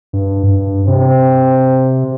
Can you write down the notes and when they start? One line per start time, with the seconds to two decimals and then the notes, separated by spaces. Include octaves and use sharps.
0.13 G2
0.43 G2
0.88 C3 C4